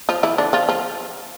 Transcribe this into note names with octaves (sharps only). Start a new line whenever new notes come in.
F3 F4
E3 E4
D3 D4
F3 F4
F3 F4